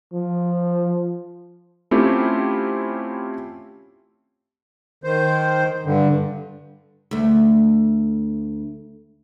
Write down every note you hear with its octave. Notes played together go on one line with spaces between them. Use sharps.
F3
A3 C4 C#4 E4 F4 G4
D#3 C5
G2 D3
D2 A3